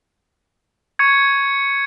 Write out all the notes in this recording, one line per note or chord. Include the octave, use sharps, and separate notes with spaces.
C#6 G#6 C#7